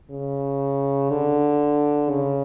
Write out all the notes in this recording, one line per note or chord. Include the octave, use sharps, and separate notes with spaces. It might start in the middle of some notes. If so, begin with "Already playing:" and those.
C#3
D3
C#3